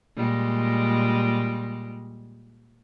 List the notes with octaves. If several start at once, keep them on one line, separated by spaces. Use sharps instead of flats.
A#2 G3 G#3